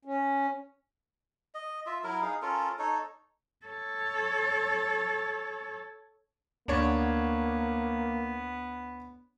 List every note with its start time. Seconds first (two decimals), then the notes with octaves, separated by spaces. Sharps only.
0.05 C#4
1.54 D#5
1.86 F4 E5
2.04 F#3 E4 A#4
2.22 D#4 G#4 F5
2.42 C#4 F4 A4 A#4
2.79 D#4 A4 C#5
3.66 A4 C#5
6.68 D2 A#3 B3 D4 C#5